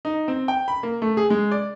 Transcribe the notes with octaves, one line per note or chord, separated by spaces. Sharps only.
D#4
C4
G5
B5
A#3
A3
G#4
G#3
D5